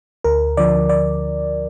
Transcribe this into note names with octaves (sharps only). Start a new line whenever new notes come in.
D2 A#4
D3 F3 D5
D5